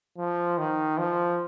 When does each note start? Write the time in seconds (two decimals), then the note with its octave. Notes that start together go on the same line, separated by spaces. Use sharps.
0.18 F3
0.58 D#3
0.98 F3